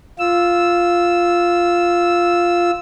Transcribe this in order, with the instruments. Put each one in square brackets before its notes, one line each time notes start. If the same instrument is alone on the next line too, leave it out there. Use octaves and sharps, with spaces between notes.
[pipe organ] F4 E6